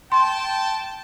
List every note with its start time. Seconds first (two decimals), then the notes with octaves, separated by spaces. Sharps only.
0.12 G5 A5 C6